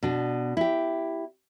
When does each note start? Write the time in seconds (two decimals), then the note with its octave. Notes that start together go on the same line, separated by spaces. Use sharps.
0.03 B2 D4
0.57 E4 G4